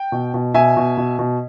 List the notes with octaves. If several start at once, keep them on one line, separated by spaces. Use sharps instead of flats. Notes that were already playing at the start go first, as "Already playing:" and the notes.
Already playing: G5
B2
B2
B2 E5 G#5
B2
B2
B2